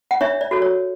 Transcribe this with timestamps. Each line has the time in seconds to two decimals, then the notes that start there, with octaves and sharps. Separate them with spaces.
0.11 F#5
0.21 D4 C#5 E5
0.41 D5
0.51 F#4 A4 C#5
0.62 C#5